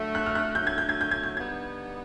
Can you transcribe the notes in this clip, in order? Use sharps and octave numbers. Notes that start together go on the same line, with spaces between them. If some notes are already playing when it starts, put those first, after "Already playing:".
Already playing: D3 F#3 A3
F#6
F6
F#6
D3 F#3 A3 G6
G#6
G6
G#6
G6
G#6
G6
D3 G3 B3 D#4 G#6